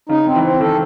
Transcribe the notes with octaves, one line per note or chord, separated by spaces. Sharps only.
C#3 D#4
C4
E3
C4
D#3 A4